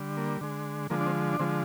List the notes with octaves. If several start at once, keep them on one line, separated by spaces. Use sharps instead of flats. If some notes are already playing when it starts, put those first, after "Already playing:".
Already playing: D3 G3
A#3
D3 G#3
D3 F3 G#3 A#3
D4
C4
D4
D3 F3 G#3 C4